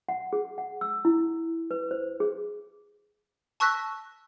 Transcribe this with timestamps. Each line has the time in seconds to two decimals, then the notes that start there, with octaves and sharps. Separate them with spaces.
0.09 F#5
0.33 G#4
0.58 F#5
0.81 E6
1.05 E4
1.71 B4
1.91 C5
2.20 G#4
3.60 A5 C#6 E6 F#6 A#6 B6